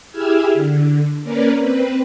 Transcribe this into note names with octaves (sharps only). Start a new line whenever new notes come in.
E4 G4 G#4 E6 F6 G#6
D3
A#3 C#4 A#4 B4 D5
C4 B4